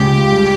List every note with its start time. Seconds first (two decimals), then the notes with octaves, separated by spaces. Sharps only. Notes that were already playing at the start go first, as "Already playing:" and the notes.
Already playing: C#2 C#3 G#3 G4
0.32 G3